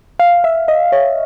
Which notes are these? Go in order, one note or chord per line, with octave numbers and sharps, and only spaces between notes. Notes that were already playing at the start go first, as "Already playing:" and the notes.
F5
E5
D#5
C#5